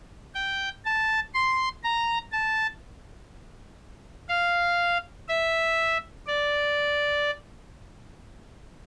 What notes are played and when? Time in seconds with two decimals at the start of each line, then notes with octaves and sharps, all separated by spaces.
0.35 G5
0.85 A5
1.34 C6
1.84 A#5
2.32 A5
4.29 F5
5.28 E5
6.27 D5